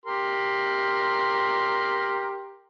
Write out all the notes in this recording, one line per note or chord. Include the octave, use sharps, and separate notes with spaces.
G4 A#4 C6